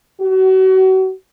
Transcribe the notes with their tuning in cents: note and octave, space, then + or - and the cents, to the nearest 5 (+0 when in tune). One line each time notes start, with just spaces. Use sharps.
F#4 +35